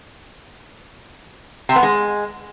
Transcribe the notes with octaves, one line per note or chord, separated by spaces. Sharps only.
C3
B3
G#3